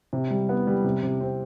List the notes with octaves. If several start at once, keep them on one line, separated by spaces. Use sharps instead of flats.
C3
G3
B3
G3
C3
C3
C4